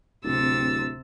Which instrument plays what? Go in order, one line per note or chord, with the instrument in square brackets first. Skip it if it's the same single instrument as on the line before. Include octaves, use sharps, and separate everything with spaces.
[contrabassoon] D1 [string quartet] C3 E6 A6